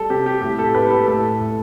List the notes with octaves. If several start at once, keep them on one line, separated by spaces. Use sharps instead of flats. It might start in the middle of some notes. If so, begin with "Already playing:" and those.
Already playing: G3 A4
C3 G4
G4
A2 G4
A4
A2 G4 B4
A4
A2 A4
A2